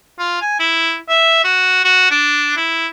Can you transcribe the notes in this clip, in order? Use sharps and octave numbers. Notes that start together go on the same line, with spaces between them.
F4
G#5
E4
E5
F#4
F#4
D4
E4